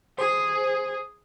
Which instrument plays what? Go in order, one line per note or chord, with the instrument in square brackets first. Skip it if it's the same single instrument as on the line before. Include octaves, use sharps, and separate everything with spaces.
[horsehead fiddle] G#4 [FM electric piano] C5